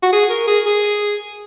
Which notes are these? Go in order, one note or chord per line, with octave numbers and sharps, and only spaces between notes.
F#4
G#4
A#4
G#4
G#4